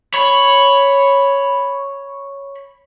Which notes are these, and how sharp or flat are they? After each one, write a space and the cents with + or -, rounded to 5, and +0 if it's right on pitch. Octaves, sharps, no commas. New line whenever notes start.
C#5 +0 B5 +0